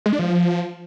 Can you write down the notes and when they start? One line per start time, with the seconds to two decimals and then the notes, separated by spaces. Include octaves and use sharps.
0.06 G#3
0.12 D4
0.19 F3